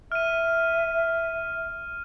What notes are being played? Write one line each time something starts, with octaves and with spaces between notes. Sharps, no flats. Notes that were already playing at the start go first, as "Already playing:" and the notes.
E5 F6 D#7